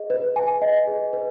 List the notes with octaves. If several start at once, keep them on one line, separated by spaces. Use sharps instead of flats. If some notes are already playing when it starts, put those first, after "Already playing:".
Already playing: G#4 D#5
B4
G#5
D#5
G#4
B4